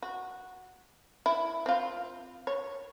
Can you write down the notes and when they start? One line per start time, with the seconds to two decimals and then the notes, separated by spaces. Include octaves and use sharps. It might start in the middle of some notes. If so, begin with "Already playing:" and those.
0.02 F#4
1.26 E4
1.66 C4 F4
2.47 C#5